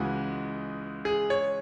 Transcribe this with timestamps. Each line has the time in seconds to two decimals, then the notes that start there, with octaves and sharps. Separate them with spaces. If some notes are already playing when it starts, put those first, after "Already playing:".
Already playing: C#2 C#3 E3 G#3 F#4
1.05 G#4
1.30 C#5